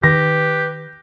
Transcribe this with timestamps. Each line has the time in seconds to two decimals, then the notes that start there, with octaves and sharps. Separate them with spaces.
0.03 D#3 G4 B4 A#6